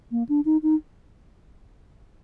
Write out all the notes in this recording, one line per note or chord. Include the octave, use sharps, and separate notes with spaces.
A#3
D4
D#4
D#4